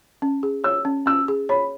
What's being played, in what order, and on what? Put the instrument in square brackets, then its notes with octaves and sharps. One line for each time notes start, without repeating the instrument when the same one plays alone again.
[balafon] C#4
G#4
[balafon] C#5 [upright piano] E6
[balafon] C#4
[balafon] C#4 [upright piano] E6
[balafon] G#4
[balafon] C#5 [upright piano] B5